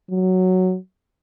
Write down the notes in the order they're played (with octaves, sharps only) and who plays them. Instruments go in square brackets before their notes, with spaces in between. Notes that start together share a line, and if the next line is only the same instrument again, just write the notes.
[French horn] F#3